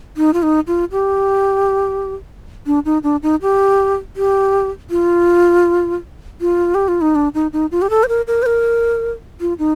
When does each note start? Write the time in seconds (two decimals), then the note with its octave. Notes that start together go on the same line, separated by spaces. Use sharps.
0.17 D#4
0.33 F4
0.43 D#4
0.67 F4
0.92 G4
2.66 D4
2.85 D#4
3.03 D4
3.23 D#4
3.42 G4
4.16 G4
4.90 F4
6.41 F4
6.75 G4
6.88 F4
7.01 D#4
7.15 D4
7.34 D#4
7.53 D#4
7.71 F4
7.82 G4
7.90 A4
8.04 C5
8.08 A#4
8.27 A#4
8.43 C5
8.46 A#4
9.40 F4
9.59 D#4